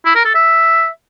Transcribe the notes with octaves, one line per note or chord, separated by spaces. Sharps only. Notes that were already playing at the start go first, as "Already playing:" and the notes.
E4
A#4
A4
E5